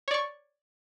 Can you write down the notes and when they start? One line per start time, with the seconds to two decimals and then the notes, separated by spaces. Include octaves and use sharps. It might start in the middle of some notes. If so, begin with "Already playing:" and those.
0.08 C#5
0.11 D5
0.14 C#6